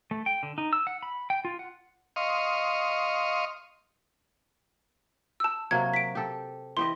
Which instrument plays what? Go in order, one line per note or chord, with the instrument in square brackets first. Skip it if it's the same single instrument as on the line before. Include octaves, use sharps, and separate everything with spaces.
[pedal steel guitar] A3
G5
D3
D#4
E6
F#5
B5
G5
F4
F#5
[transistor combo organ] D#5 F5 C6 C#6
[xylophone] A5 E6
[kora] C3 F#3 A#3 [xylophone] G#6
[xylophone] B6 D7
[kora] G4 A4
[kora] E3 G4 D#5 [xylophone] C6